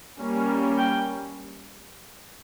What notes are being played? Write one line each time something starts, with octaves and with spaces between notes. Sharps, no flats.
G3 A#3 C#4
G5